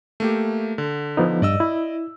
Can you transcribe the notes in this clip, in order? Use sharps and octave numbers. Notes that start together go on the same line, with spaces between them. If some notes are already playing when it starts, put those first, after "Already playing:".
A3 A#3 G4
D3
F3 B3 D#4
G2 D5 D#5 E6
E4